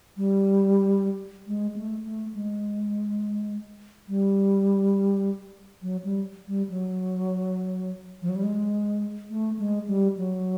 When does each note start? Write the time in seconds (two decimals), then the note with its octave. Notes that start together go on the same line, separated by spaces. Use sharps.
0.17 G3
1.47 G#3
1.76 A3
2.05 A3
2.34 G#3
4.08 G3
5.82 F#3
6.04 G3
6.47 G3
6.69 F#3
8.22 F3
8.29 F#3
8.36 G3
8.43 G#3
9.30 A3
9.59 G#3
9.88 G3
10.17 F#3